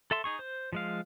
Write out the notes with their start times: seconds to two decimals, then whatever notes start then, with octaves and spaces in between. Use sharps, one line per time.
0.11 A4 E5 A5 C6
0.24 D#4 G#4 C#6
0.39 C5
0.73 F3 G#3 F5